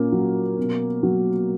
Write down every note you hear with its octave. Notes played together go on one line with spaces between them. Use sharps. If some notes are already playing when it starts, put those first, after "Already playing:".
Already playing: A#2 A#3 C#4
F#3
B2
F#3